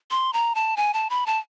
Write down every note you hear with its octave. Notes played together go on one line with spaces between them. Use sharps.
C6
A#5
A5
G#5
A5
B5
A5